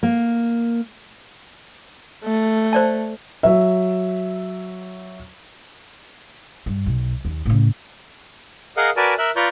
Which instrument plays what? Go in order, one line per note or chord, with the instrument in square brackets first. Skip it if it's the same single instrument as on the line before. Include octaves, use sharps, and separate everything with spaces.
[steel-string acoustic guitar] A#3
[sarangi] A3
[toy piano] C5 D5 A5
[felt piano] F#3 E5
[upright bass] G2
B1
D#2
A2 C#3
[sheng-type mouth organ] G#4 A#4 D#5 F5 F#5
F#4 A#4 B4 D5 G#5 A5
A#4 E5 F#6
F4 B4 D5 A#5 C#6 G6